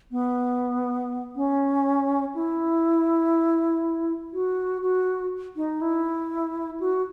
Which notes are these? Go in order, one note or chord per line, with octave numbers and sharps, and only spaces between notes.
B3
C#4
E4
F#4
F#4
D#4
E4
F#4